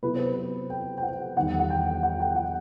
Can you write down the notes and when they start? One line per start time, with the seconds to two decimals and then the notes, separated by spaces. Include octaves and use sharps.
0.03 C3 F#3 B3 E4 B4
0.15 C5
0.27 B4
0.70 G5
0.98 G5
1.03 F#5
1.36 E2 D#3 G3 B3 F#5
1.59 F#5
1.70 G5
2.03 F#5
2.20 G5
2.36 F#5